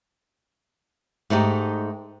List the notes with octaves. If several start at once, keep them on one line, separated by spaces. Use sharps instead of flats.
G#2 A3 D#4 G4